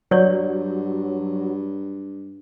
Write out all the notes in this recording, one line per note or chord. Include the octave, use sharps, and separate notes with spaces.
G2 F#3 C#5 D5